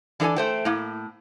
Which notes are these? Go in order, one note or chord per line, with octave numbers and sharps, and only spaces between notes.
E3 D4 A4 D#5 G#5
A3 C5 G5
A2 A#3